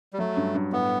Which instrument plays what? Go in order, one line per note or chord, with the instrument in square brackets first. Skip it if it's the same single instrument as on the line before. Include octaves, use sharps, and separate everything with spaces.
[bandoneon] G3
[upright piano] F#3 [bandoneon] A3
[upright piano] G2
G2
[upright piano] A2 [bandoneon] B3